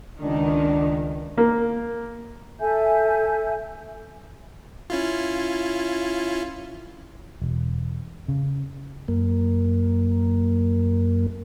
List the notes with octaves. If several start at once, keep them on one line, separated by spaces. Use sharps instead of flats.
C#2 D#3 D4
A#3
A4 E5 G#5 G6
C#4 E4 F4
E1
C#3
F#2 A#3